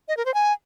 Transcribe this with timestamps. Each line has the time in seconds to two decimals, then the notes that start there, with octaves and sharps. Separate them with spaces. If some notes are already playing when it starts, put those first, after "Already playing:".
0.08 D#5
0.17 A#4
0.25 C5
0.34 G#5